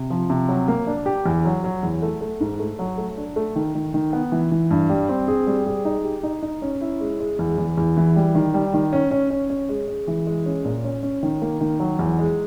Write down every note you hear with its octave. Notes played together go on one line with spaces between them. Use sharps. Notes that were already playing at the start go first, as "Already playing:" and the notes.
Already playing: C3
F3
C3
F#3
A#3
D4
G4
E2
F#3
F#3
E2
A3
A3
G#2
A3
F#3
A3
D4
A3
D#3
D#3
D#3
B3
E3
E3
G2
G3
C4
G#4
G3
G#4
D#4
G4
D#4
D#4
C#4
E4
G#3
G#3
E2
E2
E2
E3
G3
D#3
G3
D#3
C#4
C#4
C#4
C#4
G#3
G#3
E3
G#3
C#4
A#2
C#4
C#4
D#3
A#3
D#3
F#3
E2
G#3